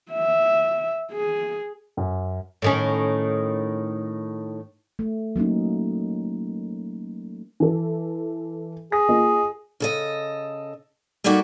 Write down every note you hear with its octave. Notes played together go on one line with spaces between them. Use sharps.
E5
G#4
F#2
A2 D#3 C#4
A3
F#3 A#3 C#4 D#4
E3 A4
G#4 A#6
A#3 F4 D#5
C#3 A4 D#5
G3 A#3 D#4 F#4 G4 A4